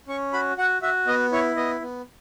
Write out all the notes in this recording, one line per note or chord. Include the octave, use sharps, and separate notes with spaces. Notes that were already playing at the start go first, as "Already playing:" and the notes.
C#4 C#6
F#4 B5
F#4 F#5
F#4 E5
B3 D#5
E4 C#5
B3 D#5
B3